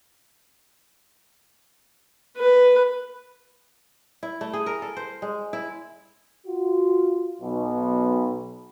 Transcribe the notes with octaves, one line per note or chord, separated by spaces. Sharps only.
B4
E4
A3
G#4
A#4
A4
C5
G#3
E4
F4 F#4
B1 B2